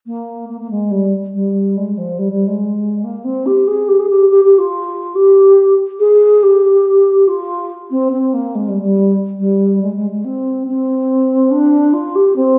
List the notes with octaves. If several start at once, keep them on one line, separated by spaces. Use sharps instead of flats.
A#3
A#3
A#3
G#3
G3
G3
G#3
F3
G3
G3
G#3
A#3
C4
G4
G#4
G4
G#4
G4
G4
G4
F4
G4
G#4
G4
F4
C4
C4
A#3
G#3
G3
G3
G3
G#3
G#3
G#3
C4
C4
D4
F4
G4
C4